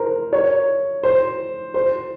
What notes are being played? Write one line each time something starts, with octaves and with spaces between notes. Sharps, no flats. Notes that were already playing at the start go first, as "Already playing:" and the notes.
Already playing: A#4 C5
C#5
C5
C5